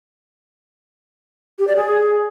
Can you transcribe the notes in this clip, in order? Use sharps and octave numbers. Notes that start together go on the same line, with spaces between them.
G4
D5
G#4